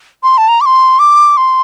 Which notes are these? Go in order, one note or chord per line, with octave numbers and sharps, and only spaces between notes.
C6
A5
A#5
D6
C6
D6
C6